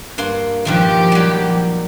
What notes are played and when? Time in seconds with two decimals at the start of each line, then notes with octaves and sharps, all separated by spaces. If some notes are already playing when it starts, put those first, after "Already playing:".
0.18 G2 A#3 C6
0.65 G2 A#2 D#3 F3 G4
1.12 F#3 G3